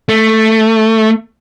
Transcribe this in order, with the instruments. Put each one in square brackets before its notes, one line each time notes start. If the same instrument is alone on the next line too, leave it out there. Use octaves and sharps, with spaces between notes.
[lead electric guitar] A3